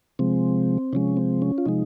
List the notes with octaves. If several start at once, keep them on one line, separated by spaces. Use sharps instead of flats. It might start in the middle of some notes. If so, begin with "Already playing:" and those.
C3 F3 G#3 C4
C3 F3 G#3 C#4
C4
C#4
F4
C3 F3 G#3 D#4